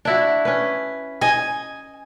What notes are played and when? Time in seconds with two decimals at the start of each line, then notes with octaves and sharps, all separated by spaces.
0.05 D4 E4 F#4
0.45 C#4 B4
1.21 D#5 G#5